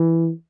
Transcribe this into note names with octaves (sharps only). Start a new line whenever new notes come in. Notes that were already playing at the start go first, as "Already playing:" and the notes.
Already playing: E3